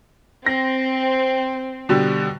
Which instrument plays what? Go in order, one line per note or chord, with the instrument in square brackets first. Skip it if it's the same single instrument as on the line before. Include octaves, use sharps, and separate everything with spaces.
[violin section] C4 [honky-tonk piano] A#6
[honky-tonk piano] B2 D3 G3